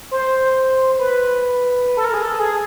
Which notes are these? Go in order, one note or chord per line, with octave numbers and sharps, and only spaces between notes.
C5
B4
A4
A#4
G#4
A4
G#4